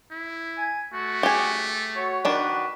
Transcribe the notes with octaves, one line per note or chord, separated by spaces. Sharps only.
E4
G#5
A3 F#4
G4 G#4
F#4 C#5
D#3 D4 B4